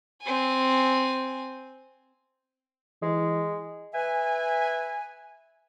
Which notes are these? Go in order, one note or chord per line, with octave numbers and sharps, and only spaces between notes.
C4 G#5
E3 G#3
B4 E5 G#5